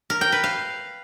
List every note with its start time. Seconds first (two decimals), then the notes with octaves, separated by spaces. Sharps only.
0.10 A#4
0.21 G5
0.32 B4
0.44 F5